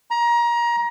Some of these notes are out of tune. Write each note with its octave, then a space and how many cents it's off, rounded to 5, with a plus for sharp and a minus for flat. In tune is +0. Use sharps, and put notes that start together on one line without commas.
A#5 +25